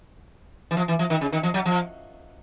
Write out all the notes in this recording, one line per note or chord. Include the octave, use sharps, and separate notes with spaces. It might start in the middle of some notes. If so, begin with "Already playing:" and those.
E3
F3
E3
F3
D#3
C#3
D#3
F3
F#3
F3